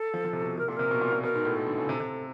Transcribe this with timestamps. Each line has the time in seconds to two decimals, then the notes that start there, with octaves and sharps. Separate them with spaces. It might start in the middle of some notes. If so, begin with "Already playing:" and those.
Already playing: A4
0.14 F3
0.24 F3
0.33 C3
0.41 B2
0.58 C3 A#4
0.68 A#2 A4
0.76 C3 A#4
0.91 B2
1.01 A#2
1.12 A#2
1.23 B2 A#4
1.34 G#2
1.45 A2
1.56 A4
1.66 D3
1.78 C#3
1.89 C3
2.00 C3